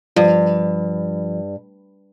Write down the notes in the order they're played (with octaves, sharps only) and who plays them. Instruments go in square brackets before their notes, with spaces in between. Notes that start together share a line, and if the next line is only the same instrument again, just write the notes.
[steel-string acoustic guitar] G2 [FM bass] F3